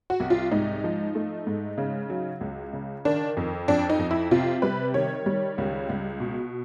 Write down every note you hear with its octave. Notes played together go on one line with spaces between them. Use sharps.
F#4
C2
F4
G#2 D#4
F3
A3
G#2
C#3
F#3
C#2
C#3
D#3 D4
F2
F2 D4
D#4
F2
E4
C3 F4
G3 B4
D#3 C#5
G3
C#2
C#2
B2